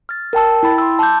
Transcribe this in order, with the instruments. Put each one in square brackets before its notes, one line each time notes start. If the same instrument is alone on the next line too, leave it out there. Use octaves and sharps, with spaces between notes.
[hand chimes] F6 A6
A#4 G5 A5 E6
E4 G5 B5 A6
C6 E6
A5 C6 D6 G6